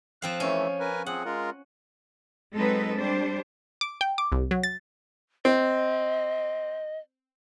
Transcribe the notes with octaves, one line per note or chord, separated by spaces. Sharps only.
F3 C4 F5 F#6
E3 A3 C#4
A#4 B4 G#5
F3 C4 G#4 F#5
G#3 F4 A#4
F#3 G#3 C4 D#4 A4 B4
G3 D4 C5
D6
G5
D6
C2
F#3
A6
C4 D#5